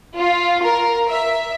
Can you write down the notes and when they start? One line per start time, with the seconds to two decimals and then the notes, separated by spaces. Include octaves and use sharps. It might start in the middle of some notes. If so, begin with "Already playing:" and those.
0.17 F4
0.65 A#4
1.07 E5